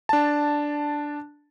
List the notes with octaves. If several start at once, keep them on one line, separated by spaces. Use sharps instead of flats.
D4 A5